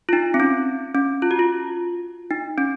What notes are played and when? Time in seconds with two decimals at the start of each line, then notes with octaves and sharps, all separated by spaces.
0.09 F4
0.13 D#4
0.34 C4
0.40 C#4
0.95 C#4
1.22 F4
1.31 F#4
1.39 F4
2.31 D#4
2.58 C#4